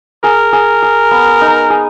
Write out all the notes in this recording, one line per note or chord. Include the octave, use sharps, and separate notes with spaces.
G#4 A#4
G#4
G#4
B3
D#4
G#4